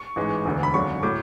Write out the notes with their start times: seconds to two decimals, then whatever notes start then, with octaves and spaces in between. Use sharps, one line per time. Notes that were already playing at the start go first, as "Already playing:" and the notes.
Already playing: C#6
0.16 A1 G#2 E3 G#3
0.45 E1 D2 D3
0.63 B5
0.74 G#1 F#2 D3 F#3 C#6
1.03 A2 F#3 D6